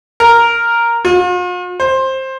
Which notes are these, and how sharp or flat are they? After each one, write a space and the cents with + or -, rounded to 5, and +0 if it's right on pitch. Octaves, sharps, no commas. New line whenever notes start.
A#4 +0
F4 +45
C5 +15